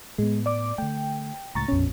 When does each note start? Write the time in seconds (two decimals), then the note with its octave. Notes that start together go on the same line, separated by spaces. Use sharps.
0.18 A2 G#3 B3
0.46 D5 D6
0.78 D3 A3 G5
1.55 C#2 A2 A#5 C#6 A6
1.68 A#1 F2 B2 C#4